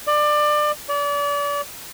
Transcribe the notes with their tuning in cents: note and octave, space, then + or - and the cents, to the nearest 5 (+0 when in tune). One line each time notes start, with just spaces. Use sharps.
D5 +25
D5 -35